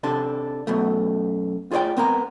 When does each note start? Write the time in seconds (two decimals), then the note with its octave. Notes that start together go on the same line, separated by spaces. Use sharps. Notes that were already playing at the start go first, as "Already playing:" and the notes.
0.03 C3 D4 A4
0.67 F#2 B2 A3
1.71 F4 G#4 C#5 D5 G5
1.97 B3 C4 A#4 A#5